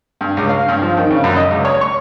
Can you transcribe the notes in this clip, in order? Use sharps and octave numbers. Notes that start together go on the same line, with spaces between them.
G2
C#2
F5
G2
F3
D#3
C#3
F#2
D#5
C#2
C#5
C#6